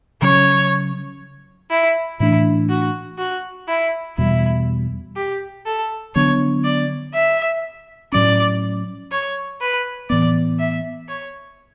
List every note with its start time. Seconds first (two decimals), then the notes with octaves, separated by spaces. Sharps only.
0.22 C#3 F#3 C#4 C#5
1.71 E4
2.20 A2 E3 A3 D4 E4
2.70 F#4
3.18 F#4
3.68 E4
4.18 E2 B2 G3 E4
5.16 G4
5.66 A4
6.15 D3 F#3 B3 D4 C#5
6.65 D5
7.14 E5
8.12 A2 F#3 C#4 D5
9.11 C#5
9.61 B4
10.10 A2 E3 B3 D5
10.59 E5
11.09 C#5